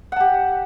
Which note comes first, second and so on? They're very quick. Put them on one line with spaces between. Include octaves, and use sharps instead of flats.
F#5 A5 G4